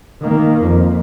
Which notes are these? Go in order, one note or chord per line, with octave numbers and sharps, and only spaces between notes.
D#3 A#3
F2